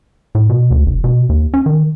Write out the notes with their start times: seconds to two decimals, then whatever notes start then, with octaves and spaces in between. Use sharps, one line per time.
0.35 A2
0.50 B2
0.71 D2
0.86 F1
1.04 B2
1.29 D#2
1.54 C#4
1.66 D#3